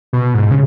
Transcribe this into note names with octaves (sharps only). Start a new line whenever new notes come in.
B2
G#2
C#3